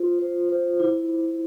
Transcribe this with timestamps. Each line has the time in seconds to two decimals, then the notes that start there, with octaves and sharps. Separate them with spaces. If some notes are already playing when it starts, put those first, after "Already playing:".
Already playing: F4 C5
0.19 C5
0.49 C5
0.80 E4